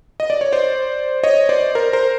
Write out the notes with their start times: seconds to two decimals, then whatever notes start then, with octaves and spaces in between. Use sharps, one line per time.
0.20 D#5
0.30 D5
0.41 C#5
0.52 C5 D5
1.23 C#5 D#5
1.49 C5 D5
1.75 A#4 C5
1.93 A#4 C5